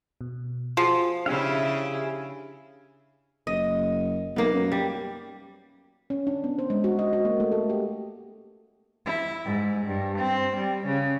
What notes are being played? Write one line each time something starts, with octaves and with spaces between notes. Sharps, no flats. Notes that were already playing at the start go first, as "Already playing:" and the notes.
B2
F3 F4 F#4 G#4
C#3 D4 E4 G4 G#4 E5 F5
F#1 D#5
B1 A#3 B3
F#2
G3
C#4
D4
B3
C5
G#3
F#4
D#5
F#4
A#3
A3
A4
G4
E4
G#2
G2
C4
G3
C#3